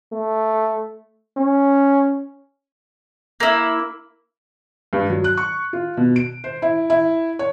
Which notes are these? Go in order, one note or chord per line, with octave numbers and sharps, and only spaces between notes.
A3
C#4
A#3 E4
G2
F#3
F#6
C#6
F4
B2
D7
C5
E4
E4
C#5